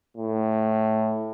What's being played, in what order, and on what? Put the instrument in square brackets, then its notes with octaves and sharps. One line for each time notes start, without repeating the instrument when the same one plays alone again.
[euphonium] A2